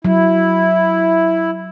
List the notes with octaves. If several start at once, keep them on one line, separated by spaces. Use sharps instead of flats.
F#3 E4